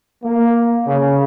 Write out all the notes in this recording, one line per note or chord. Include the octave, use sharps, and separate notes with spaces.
A#3
C#3